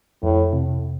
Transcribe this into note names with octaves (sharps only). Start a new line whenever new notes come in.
F2 A2
C3